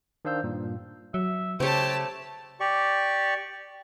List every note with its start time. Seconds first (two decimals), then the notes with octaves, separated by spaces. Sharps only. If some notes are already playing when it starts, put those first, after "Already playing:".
0.25 D#3 D4 C5 F5 E6 G6
0.44 G2 A#2
1.14 F#3 E5
1.60 C#3 A3 G4 C5 C#5 A5
2.60 G4 D5 C#6